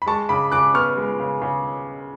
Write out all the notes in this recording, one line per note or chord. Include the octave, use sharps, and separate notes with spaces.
B5
G#3 A5 C#6
C#3 B5 D6
C#3 D6 F#6
B3 C#6 F6
G#3
C#3
C#3